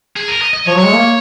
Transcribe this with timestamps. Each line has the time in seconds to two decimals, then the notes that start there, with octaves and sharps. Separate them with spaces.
0.16 G#4
0.28 A#4
0.42 D#5
0.54 D#5
0.67 F3 C#5
0.75 F#3
0.79 G#3 C#5
0.92 A#3